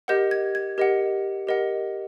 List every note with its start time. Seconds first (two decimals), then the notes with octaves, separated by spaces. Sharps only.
0.08 G4 A#4 D#5 F#5 G6
0.31 G#6
0.55 G#6
0.78 G4 A#4 D#5 F#5
1.47 G4 A#4 D#5 F#5